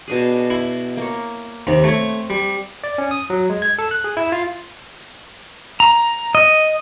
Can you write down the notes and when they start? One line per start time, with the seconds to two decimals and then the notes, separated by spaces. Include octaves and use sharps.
0.08 B2 D4 G#4
0.50 E4
0.97 A#3 C#5
1.67 D#2 C3
1.84 A3 C4 C#5
2.30 G3
2.84 D5
2.98 C#4
3.11 D#6
3.30 F#3
3.50 G#3
3.62 G#6
3.79 A4
3.91 F#6
4.04 G#4
4.17 E4
4.32 F4
5.80 A#5
6.35 D#5